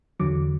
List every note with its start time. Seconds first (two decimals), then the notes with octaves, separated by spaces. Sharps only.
0.20 E2 D3 F#3 D6